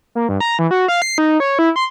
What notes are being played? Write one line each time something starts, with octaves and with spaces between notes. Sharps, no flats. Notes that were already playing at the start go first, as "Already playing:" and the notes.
A#3
G2
A#5
E3
F#4
F5
C7
D#4
C#5
E4
C6